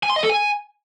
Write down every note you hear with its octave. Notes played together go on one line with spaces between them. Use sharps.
G#5
C6
D#5
A4
G#5